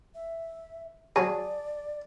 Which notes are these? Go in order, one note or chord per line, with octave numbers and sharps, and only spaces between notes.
E5
F#3 G#4 C#5 D5 A5 A#5